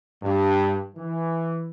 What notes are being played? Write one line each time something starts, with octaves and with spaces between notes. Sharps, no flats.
G2
E3